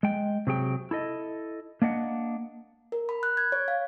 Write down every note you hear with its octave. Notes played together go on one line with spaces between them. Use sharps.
G#3 G5
C3 F#3 G#4 G5
E4 A4 D#5
A#3 D4 D#5 F#5
A#4
B5
F#6
G#6
C#5
F5